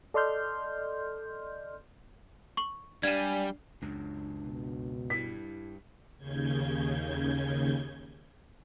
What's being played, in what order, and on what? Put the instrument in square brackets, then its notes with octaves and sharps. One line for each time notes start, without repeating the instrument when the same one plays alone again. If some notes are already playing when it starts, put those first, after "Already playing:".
[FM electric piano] A4 D5 D#5 C6 F6 G6
[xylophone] C#6 F#7
[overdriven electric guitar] G3 [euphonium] D4 [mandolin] F5 G#5 [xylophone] G#6 E7
[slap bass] C#2 F#2 [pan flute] D4
[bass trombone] B2
[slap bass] G2 [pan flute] E4 [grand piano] B6
[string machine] D#2 C#3 G6 G#6